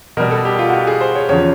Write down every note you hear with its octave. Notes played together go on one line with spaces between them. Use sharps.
B2 G3 A#4
A4
G4
F4
F#4
G4
G#4
C5
C#5
E2 C#3 F3 C#5